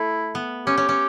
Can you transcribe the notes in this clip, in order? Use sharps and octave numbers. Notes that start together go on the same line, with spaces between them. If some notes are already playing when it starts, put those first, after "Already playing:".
Already playing: A3 E4
B3
C#4 G4
C#4
C#4